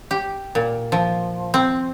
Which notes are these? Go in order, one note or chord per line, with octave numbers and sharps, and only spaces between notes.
G4
A#2
F3
C4